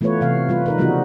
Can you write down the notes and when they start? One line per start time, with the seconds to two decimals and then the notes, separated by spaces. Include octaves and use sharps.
0.01 E3 A3 B3 F4 B4 C#5
0.21 C3 E3 F5
0.49 G3 F4 B4
0.66 D#4 A#4 B4
0.78 C#3 F3 G3 B3 D#4 F#4